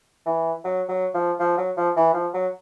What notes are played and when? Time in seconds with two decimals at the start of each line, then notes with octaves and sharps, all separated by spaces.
0.26 E3
0.65 F#3
0.89 F#3
1.14 F3
1.40 F3
1.58 F#3
1.77 F3
1.96 E3
2.14 F3
2.34 F#3